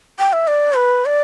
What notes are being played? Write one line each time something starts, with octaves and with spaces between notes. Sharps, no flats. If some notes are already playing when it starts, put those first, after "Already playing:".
G5
E5
D5
B4
D5